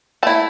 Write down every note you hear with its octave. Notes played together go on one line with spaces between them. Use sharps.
A3 E4 A5